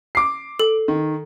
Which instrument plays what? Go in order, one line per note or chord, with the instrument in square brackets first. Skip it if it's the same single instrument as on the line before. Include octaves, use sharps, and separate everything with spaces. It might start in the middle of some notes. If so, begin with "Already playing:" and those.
[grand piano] D6 C7
[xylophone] A4
[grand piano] D#3